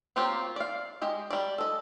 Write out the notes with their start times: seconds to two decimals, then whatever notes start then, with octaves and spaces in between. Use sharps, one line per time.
0.16 F#3 A#3 C4 F4 G4
0.56 D5 F5
1.02 G#3 G4 D#5
1.31 G3 D5
1.58 A4 D#5